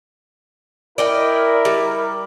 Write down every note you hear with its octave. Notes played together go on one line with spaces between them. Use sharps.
E4 A#4 D5 D#5 G5
G3